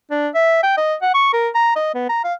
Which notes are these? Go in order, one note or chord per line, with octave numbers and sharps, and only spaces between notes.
D4
E5
G5
D#5
F#5
C#6
A#4
A#5
D#5
B3
A#5
F5